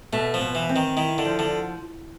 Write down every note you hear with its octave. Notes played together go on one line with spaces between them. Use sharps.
B2 A3
F3
B2
E3
C4
D#3
D#3 E4
D3
F3
D3